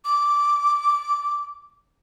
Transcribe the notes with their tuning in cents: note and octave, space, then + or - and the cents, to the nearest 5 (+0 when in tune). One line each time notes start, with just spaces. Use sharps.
D6 -10